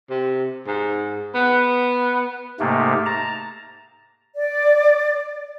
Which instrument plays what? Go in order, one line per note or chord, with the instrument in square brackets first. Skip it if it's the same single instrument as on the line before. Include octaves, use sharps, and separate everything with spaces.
[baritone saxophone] C3
G#2
B3
[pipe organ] G#2 C3 A3 A#3
A5 A#5
[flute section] D5